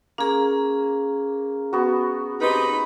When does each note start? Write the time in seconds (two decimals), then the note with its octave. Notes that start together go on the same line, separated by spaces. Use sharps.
0.18 A#3 C#4 G#4 A#5
1.73 B3 F#4
2.41 C3 D#4 B4